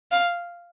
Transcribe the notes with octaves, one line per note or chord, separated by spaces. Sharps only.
F5